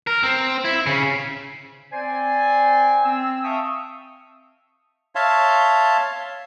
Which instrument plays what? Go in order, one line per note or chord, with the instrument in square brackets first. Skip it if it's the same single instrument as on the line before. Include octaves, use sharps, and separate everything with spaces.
[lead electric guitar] A#4
C4
E4
C#3
[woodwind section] C4 C5 D5 G#5
C4 E6
E5 F5 G5 A5 C#6 D#6
[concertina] C#5 E5 F5 A5 C6